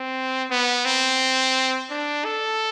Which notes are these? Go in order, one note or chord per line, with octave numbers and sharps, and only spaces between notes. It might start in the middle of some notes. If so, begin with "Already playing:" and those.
Already playing: C4
B3
C4
D4
A4